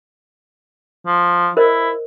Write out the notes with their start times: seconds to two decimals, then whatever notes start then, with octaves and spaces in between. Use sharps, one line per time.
1.06 F3
1.57 E4 A#4 C5 D#5